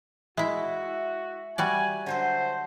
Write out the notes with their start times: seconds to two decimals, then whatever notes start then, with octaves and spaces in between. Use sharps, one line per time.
0.37 G#3 E4 F#4 E5
1.58 G3 F#4 D5 G#5
2.06 D3 F#3 A4 C5